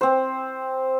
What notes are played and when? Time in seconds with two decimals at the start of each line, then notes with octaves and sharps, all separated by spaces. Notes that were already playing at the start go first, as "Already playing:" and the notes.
0.01 C4 C5